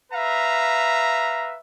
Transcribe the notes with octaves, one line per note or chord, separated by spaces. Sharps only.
B4 E5 F5 A#5